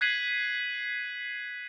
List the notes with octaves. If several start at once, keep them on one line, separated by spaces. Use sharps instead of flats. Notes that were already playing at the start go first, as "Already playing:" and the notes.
F#6 G#6 B6 C7 D#7 F#7